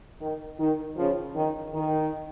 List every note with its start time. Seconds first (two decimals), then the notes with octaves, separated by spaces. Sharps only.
0.20 D#3
0.59 D#3
0.97 C#3 F3
1.36 D#3
1.74 D#3